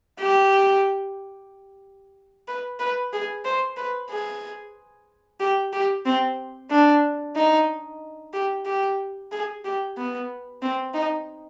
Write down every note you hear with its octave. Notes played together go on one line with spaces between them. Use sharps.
G4
B4
B4
G#4
C5
B4
G#4
G4
G4
C4
D4
D#4
G4
G4
G#4
G4
B3
C4
D#4